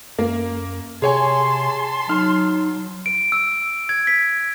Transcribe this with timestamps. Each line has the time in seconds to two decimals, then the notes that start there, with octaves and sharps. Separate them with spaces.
0.19 F#2 A#3
1.02 C3 G#4 C#5 G#5 A5 C6
2.09 F#3 D#4 F6
3.06 D7
3.32 E6
3.89 G#6
4.07 B6